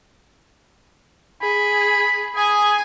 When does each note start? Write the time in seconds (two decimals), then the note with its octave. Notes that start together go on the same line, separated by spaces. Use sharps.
1.42 G#4 B5
2.36 G#4 G#5